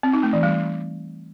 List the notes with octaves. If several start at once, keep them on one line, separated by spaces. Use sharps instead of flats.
C4
D#4
A3
E3
G3